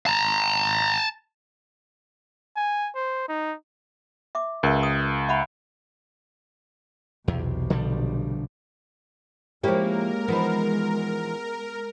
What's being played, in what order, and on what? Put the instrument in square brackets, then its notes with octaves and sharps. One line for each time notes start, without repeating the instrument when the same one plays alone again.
[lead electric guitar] A5 A#5
[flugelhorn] G#5
C5
D#4
[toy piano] E5 D6
[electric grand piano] C#2 [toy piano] A#4 E5
[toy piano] D#6
E5 F#5 B5
[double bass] B1 C3 [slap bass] E2
[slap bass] D3 F3 G3
[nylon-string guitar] F3 E4 [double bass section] G#3 [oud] A#3 C#4 G4 [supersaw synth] A#4
[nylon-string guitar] E3 F3 D#4 [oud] B3